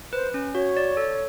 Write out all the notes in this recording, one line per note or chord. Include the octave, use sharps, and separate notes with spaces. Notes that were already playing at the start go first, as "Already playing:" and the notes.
B4 C5
C#4
F#4 C#5
D5
A4